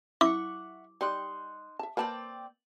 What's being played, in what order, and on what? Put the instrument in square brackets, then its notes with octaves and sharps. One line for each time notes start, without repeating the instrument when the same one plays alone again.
[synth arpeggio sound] E4 [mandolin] E5 F#5 C#6 [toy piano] D6
[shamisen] G3 D5 [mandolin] D#4 C6 F#6
[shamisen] E5 A5
[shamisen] A#3 B4 A5 [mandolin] C4 D5 G5